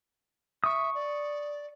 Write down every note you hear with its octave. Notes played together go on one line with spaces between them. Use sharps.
E5 C#6 D#6
D5